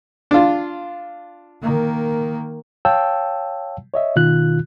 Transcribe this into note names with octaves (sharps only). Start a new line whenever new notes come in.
D4 F4
D#3 A#3
C#5 F5 G5 A5 E6
C#5 D#5 E5
B2 D#3 F4 F#6